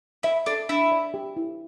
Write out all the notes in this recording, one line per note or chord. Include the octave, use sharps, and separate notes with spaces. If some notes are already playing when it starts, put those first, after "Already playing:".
E4 E5
D4 A4
D4 E4
D5
G4
E4